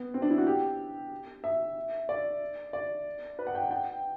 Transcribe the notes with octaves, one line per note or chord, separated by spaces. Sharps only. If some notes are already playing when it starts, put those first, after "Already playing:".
Already playing: B3
C4
D4
E4
F#4
G4
E5
D5
D5
B4
F#5
G5
F#5
G5